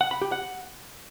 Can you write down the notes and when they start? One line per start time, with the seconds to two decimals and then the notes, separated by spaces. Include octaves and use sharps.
0.01 F#5
0.11 B5
0.22 G4
0.32 F#5